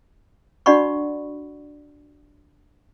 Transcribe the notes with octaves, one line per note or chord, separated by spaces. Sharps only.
D4 F#4 D5 F#5 B5 C#6